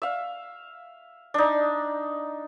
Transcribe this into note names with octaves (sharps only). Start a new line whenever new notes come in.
E5 F5
D4 D#4